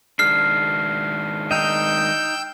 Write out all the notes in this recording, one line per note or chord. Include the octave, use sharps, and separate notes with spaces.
D#3 G#3 D4 F6 C7
D#4 D#5 G5 E6 G6